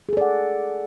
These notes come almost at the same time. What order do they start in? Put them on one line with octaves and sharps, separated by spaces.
G#4 A4 D5 F#5